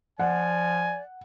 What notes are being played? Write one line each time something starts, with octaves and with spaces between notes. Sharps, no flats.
F3 D5 F#5 G#5